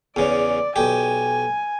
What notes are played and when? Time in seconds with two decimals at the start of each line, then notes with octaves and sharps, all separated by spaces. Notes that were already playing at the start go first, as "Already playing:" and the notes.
0.16 E2 C#3 D5
0.76 B1 G4 G#5